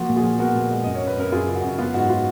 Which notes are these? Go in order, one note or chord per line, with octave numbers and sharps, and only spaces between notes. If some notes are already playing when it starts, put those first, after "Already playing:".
Already playing: F3 A#3 F#4
A#2
F4 G#4
F3
B3 F#4 A#4
A#2
G#3
F#2 D#5
C#5
F#2
B4
F#2 A#4
F#2 F4 G#4
C#3
F#4
F#2
B3 F4
G#2 F#4
F4